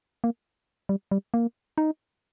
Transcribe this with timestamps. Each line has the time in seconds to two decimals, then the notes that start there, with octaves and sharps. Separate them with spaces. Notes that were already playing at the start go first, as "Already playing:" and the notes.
0.24 A#3
0.89 G3
1.11 G3
1.34 A#3
1.78 D#4